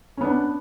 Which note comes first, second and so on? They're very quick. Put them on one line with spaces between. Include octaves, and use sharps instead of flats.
C#4 B3 D4